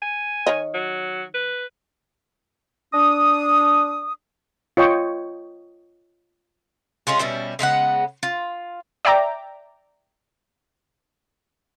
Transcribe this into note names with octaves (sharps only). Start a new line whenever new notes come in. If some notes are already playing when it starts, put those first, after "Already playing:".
G#5
D#3 C#5 D#5
F#3
B4
D4 D#6
F4 C#5 D#5 G5 C#6
G#3 C#4 F4 G#4
B2 G3 C#4 E4
C#3 G#3 B3 F#5
F4
D5 E5 G5 A#5 D6